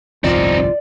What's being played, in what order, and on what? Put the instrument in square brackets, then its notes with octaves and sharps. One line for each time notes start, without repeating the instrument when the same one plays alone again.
[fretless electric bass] G1 C2 F2 [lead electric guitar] C4 D#4 [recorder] F4 [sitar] D5